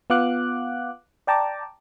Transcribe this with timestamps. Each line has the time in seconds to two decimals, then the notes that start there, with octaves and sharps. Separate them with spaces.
0.10 B3 F4 F5 F#5 D6 F#6
1.27 D5 G5 A5 A#5 D6